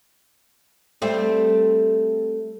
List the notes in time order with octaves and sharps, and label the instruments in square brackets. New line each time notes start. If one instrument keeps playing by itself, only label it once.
[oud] G3 A3 C4